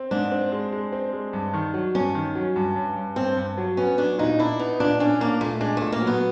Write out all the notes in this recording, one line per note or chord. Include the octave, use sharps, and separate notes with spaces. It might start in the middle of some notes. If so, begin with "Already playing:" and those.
Already playing: C4
G#2 D4
C4
G#3
G#3
C4
G#3
G2
D#3
F#3
G2 C#4
D#3
F#3
G2
G2
G2
G2 C4
G2
F#3
B3 C#4
F#3 D4
A#2 D#4
D4 E4
B3 D#4
A#2 D4
C#4 D4
A#3 D4
A#2 A3
G#3 D4
A#2 A3
A#3
F#3
B3